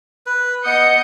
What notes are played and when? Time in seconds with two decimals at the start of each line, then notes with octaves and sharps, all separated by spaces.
0.26 B4
0.66 B3 D#5 D#6 G6 C#7